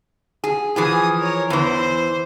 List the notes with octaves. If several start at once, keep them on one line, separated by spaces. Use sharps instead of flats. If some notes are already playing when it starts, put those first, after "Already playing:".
G#4
E3 F3 G#4 G#5 D#6
A#4 C#5
E2 E3 C5